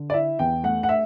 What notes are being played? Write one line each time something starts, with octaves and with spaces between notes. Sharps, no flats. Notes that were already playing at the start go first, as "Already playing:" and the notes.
Already playing: D3
D5
E4 E5
E2 G5
A3 F#5
F#5
E5